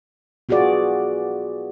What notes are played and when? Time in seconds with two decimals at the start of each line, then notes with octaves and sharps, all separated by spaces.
0.49 B3 F4 F#4 G#4 D5